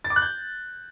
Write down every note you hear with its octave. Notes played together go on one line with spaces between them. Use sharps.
A6
D6
F#6
G6